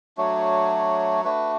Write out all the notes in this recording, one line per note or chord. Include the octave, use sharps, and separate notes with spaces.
F#3 A3 D4 F#4 C#5
A3 D4 F#4 B4